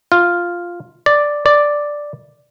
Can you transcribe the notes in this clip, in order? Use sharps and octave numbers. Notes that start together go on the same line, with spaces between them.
F4
D5
D5